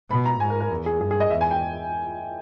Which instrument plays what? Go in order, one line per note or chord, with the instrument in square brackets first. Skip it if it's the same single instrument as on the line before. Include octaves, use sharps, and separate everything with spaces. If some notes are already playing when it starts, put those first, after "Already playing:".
[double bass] B2 [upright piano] B5
[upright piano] A#5
[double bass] G#2 [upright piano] G#5
[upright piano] A#4
A#4
[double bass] E2
[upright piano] G#4
[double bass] G2 [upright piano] G#4
[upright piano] G#4
D#5
[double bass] E2 [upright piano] E5
[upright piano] G#5
G5